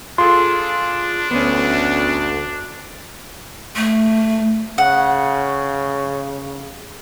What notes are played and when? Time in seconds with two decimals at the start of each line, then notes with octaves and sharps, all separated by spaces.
0.18 D4 F4 G#4 A4 C6
1.31 D2 B3 C#4
3.76 A3
4.78 C#3 F#5